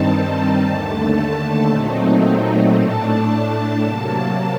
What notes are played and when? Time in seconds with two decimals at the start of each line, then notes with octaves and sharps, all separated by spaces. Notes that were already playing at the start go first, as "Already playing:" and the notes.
Already playing: G2 D#3 G3 C4 D#4 A5
0.62 D#2 D3 A3
1.15 A5
1.69 A#2 F#3 A3 C4 D#4
2.75 A2 A3 D4 A5
3.82 C3 F#3 A#3 A5